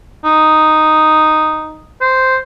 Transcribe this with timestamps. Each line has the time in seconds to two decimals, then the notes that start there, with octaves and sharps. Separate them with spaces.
0.24 D#4
2.01 C5